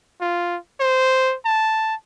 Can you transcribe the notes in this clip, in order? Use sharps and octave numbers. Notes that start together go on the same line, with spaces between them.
F4
C5
A5